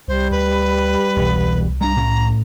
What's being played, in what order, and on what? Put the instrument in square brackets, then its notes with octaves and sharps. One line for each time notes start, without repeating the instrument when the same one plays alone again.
[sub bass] C2 [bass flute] G3 [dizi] C5
[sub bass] D2 [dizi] B4
[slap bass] E1 [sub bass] C2
[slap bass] G3 A#3 D4 [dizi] A#5
[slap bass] A2 C#4